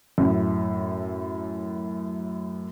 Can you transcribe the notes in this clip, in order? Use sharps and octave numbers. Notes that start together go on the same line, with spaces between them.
F#2 A2